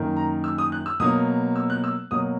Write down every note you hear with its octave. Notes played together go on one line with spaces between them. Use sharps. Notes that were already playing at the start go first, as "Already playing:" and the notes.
Already playing: F#2 D#3 A#3
A#5
E6
D#6
F#6
E6
B2 F#3 A#3 D#6
E6
F#6
E6
B2 F#3 A#3 D#6